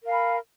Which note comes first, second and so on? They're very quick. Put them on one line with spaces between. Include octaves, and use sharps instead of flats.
A#4 F5 G#5 B5